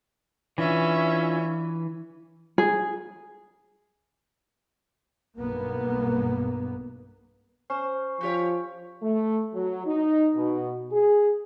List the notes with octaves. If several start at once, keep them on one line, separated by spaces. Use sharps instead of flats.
E3 C#4 D4 F4 E5 G#5
G#4
B1 G2 A#3 B3
C#4 C5
F3 F4 G4 C#5
A3
F#3
D#4
B2
G#4